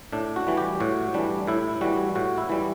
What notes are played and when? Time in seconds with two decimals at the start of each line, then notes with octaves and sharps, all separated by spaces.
0.13 A2 D4
0.36 F#4
0.47 E3 G3
0.57 G4
0.80 A2 F#4
1.14 E3 G3 D4
1.47 A2 E4
1.81 E3 G3 F#4
2.15 A2 F#4
2.38 E4
2.50 E3 G3